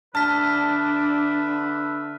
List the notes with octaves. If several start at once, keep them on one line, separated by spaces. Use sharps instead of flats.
D3 D4 B4 E5 A5 F6 B6